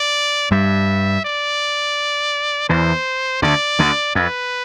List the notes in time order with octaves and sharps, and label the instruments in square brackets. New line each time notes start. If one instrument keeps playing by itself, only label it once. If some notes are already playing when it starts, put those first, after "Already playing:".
Already playing: [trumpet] D5
[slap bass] G2 G3 [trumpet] E5
[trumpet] D5
[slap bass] E2 E3 [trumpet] C5
[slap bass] D2 D3 [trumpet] D5
[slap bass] D2 D3
[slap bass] F2 [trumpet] B4